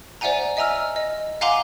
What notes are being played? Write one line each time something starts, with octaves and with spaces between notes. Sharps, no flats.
C5 D5 E5 F#5 G#5 A#5
D#5 E5 G#5 A#5 E6 F6
D#5
F5 F#5 G#5 A#5 C6 D6